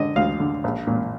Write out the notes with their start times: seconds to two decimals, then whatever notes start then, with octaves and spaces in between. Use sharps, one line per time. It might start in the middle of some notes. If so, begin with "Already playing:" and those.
Already playing: D3 D#5
0.16 D2 F5
0.40 D3
0.64 A#1
0.87 A#2